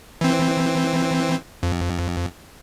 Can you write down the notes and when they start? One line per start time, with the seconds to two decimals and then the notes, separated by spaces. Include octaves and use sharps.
0.21 E3 C4
1.63 F2